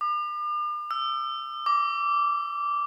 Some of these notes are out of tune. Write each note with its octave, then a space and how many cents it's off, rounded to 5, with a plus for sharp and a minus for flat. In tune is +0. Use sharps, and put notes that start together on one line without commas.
D6 +40
E6 +25
D6 -15